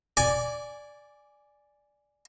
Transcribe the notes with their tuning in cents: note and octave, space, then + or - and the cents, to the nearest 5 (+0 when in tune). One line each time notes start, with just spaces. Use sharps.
D5 +0 G#5 +0 D6 -20